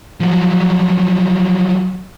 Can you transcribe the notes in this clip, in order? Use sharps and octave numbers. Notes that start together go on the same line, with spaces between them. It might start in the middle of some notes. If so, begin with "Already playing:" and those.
F3 F#3